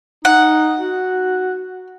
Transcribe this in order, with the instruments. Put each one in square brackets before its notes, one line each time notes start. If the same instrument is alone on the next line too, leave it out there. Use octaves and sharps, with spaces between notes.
[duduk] D#4 [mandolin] F#5
[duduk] F#4